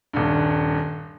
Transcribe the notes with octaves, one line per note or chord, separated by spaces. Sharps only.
D#1 G2